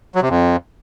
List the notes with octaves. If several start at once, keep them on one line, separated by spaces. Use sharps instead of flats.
F#3
C3
F2